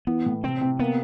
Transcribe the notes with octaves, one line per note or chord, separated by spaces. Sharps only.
E3 B3
A2
C3 C4
C3
A#3 B3